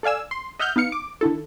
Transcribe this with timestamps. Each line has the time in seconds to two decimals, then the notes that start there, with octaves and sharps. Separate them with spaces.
0.03 A4 D5 F5 G#5 E6
0.31 C6
0.59 D#5 E5 F#5 F6 G6
0.76 B3 D#4 F5 C#7
0.92 D6
1.21 D3 D#3 E4 A4